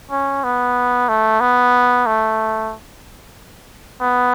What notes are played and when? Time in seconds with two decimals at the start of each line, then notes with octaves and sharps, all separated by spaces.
0.11 C#4
0.44 B3
1.09 A3
1.40 B3
2.06 A3
4.01 B3